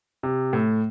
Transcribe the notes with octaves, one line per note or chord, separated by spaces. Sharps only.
C3
A2